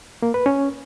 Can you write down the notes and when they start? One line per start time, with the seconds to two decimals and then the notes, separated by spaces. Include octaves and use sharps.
0.22 A#3
0.34 B4
0.46 C#4